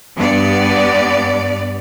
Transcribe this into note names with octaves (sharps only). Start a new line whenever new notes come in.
G2 B3 D5